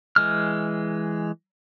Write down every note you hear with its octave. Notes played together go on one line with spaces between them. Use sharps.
E3 G#3 F6